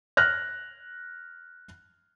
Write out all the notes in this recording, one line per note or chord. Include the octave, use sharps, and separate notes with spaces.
F6 F#6 A#6